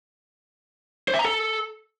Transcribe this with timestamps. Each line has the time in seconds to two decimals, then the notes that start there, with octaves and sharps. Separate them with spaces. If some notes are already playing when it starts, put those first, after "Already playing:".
1.08 C5
1.14 E5
1.19 A#5
1.25 A4